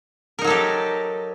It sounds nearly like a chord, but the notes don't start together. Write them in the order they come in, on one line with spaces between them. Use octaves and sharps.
A#4 D#4 F#3 A4 G4